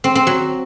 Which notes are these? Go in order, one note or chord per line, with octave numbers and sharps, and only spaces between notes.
C4
C4
F#3